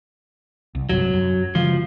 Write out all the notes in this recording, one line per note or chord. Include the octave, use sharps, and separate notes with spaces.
C2
D#1 G2 C3 F#3
F#2
C#3 E3 F3 G#3